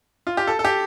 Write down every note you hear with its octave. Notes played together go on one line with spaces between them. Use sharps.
F4
G4
A4
A4
G4